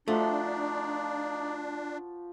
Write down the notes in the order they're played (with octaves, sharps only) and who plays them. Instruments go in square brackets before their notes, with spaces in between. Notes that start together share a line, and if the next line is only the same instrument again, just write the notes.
[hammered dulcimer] F3 F#4 [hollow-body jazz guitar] A3 [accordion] D4 [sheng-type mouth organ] D#4 D5